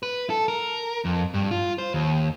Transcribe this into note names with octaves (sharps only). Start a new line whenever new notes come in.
B4
A4
A#4
F2
G2
F4
C5
D#2